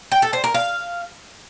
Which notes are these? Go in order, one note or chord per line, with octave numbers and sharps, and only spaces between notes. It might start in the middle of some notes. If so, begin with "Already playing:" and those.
G5
A4
C5
A#4
F5